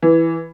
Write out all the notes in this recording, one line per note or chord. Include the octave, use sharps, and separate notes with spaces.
E3